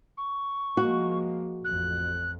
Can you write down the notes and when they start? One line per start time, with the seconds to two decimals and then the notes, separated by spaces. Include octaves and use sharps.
0.18 C#6
0.77 F3 G#3 A#3 F#4
1.65 A1 F2 F#6